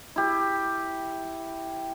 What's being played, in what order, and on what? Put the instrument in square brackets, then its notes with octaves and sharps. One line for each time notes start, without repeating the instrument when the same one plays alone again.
[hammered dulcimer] E4 G4